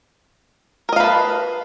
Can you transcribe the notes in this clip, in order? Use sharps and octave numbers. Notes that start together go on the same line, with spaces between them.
A#4 B4 D#5 F5 A5